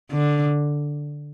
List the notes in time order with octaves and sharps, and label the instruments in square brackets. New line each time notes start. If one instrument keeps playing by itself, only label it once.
[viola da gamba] D3